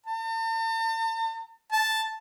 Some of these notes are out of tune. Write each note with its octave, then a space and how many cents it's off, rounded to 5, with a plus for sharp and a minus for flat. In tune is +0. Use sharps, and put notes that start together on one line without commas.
A5 +45
A5 +0